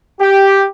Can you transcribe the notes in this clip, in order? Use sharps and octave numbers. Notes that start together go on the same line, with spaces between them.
G4